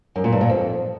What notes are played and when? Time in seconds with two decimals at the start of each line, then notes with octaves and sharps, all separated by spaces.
0.16 F#2
0.24 A#2
0.32 G2
0.41 A#2
0.49 F2